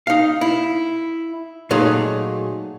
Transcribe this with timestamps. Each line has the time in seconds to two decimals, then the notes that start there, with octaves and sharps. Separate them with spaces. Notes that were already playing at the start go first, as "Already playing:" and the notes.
0.07 D#4 F5
0.41 E4
1.71 A#2 F#3 A3 D#4 G#4